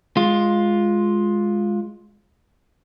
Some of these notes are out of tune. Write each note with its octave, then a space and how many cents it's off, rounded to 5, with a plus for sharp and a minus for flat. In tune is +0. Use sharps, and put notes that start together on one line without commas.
G#3 +0 F4 +5